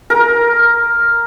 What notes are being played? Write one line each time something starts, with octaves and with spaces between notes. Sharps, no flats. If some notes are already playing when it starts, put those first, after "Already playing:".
A#4